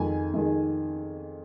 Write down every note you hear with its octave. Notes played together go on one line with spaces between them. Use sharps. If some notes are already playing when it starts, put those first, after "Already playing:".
Already playing: F2 D#3 G#3 G#5
F2 D#3 G#3